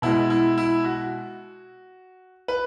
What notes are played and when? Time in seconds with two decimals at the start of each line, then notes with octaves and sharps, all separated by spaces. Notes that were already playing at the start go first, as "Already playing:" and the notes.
0.02 B2 G#3 E4
0.30 E4
0.58 E4
0.84 F#4
2.48 B4